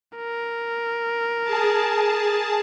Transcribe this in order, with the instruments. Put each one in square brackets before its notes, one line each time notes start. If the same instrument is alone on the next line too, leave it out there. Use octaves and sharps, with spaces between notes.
[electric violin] A#4
[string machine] G#4 A5